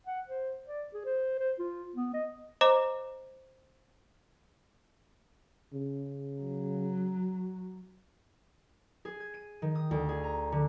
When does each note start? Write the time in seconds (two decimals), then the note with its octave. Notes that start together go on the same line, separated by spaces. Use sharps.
0.07 F#5
0.28 C5
0.66 D5
0.93 G#4
1.05 C5
1.39 C5
1.59 F4
1.95 B3
2.13 D#5
2.61 C5 D#5 A#5 D6
5.73 C#3
6.40 F#3
9.05 G#4
9.20 G#6
9.34 D#7
9.62 D#3
9.75 D#6
9.91 D2
10.09 G#4
10.24 A#5
10.52 D3